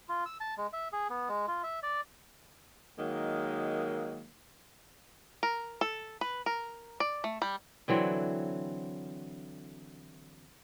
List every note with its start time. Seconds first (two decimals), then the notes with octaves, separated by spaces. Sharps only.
0.09 F4
0.26 E6
0.40 A5
0.58 G#3
0.73 E5
0.93 G#4
1.10 B3
1.29 G#3
1.48 F4
1.63 E5
1.83 D5
2.99 D#3 F#3 G#3 A#3
5.43 A#4
5.81 A4
6.21 B4
6.46 A#4
7.00 D5
7.24 A3
7.42 G3
7.88 D3 E3 F#3 C4